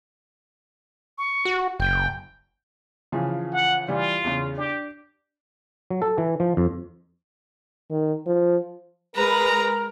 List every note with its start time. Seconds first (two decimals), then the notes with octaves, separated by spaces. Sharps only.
1.18 C#6
1.45 F#4
1.80 F#1 G5
3.12 C#3 E3 F3
3.53 F#5
3.88 E3 G3 F4
4.24 E2 C#3
4.57 D4 G4
5.90 F#3
6.02 A4
6.18 E3
6.40 F3
6.57 F2
7.91 D#3
8.27 F3
9.16 G#3 A#4 B4 A#5